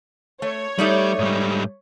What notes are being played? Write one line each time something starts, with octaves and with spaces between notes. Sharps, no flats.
A3 C#5
G3 A3 D#4 D5
G#2 G3